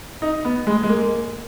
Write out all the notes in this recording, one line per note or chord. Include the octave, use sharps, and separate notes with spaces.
D#4
B3
G#3
G#3
A#3